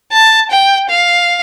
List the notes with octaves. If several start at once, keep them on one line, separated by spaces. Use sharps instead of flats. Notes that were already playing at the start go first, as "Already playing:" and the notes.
A5
G5
F5